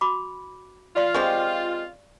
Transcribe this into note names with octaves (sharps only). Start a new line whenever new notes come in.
F#4 B5 D6
F4 D5 F5 C6
G#3 C4 G4 C#6